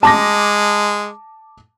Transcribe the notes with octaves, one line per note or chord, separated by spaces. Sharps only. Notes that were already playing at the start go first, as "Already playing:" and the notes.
G#3 A5 D6 A#6